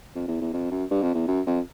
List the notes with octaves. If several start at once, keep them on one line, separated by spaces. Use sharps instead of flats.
F2
E2
E2
F2
F#2
G2
F2
E2
F#2
F2